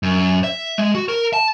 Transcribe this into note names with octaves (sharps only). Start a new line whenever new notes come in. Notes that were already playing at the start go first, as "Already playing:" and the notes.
F#2
E5
G#3
F#4
A#4
A5